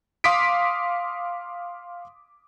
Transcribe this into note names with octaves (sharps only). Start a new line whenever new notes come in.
F5 C6 D6 D#6 B6 D7